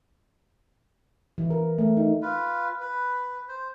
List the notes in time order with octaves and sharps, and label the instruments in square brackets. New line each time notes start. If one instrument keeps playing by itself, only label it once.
[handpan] E3
A#4
A3
D#4
[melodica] F4 B4
B4
C5